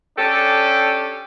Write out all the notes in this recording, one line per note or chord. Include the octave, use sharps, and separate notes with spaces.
C#4 D4 G4 A4